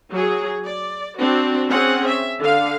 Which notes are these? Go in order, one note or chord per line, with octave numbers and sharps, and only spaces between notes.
F#3 G#4
D5
C4 D4 F#4
C4 C#4 G#4 F#5
E5
D3 F5